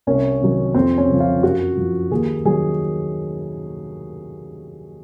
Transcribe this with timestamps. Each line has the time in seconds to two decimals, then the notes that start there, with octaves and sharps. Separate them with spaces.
0.07 C2 C#4
0.40 C3 D#3 F#3
0.74 F2 C4
0.98 C#4
1.09 C#3 F3
1.20 F4
1.43 F#2 F#4
1.77 F3
2.11 D#2 G#4
2.45 D#3 F#3 G#4